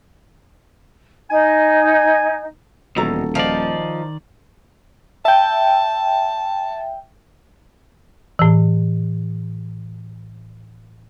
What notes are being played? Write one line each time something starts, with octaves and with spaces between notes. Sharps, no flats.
D#4 G#5
D#1 E2 B2 F#4 A4 A#5
D#3 F3 D#4 D5
E5 G5 A5
A2 E3